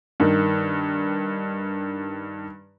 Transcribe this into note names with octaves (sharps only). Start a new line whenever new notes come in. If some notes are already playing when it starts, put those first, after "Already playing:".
G2 D#3